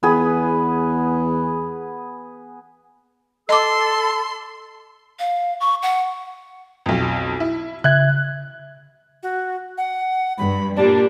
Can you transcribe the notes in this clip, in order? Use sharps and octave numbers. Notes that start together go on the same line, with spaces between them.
E2 B3 G#4 B4
A4 D#5 A5 C6 D6 E6
F5
C#6
F#5
B1 F2
E4
C#3 E5 F#6 G#6
F#4
F#5
G2 B5
A#2 G3 D4 D5